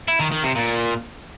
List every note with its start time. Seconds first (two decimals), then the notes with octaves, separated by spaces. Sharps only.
0.08 E4
0.20 D#3
0.32 D#3
0.44 C3
0.55 A#2